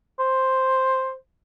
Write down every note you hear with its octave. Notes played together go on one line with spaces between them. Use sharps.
C5